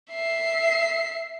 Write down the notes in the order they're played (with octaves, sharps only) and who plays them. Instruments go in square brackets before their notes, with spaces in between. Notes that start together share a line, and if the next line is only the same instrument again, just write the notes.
[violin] E5 C7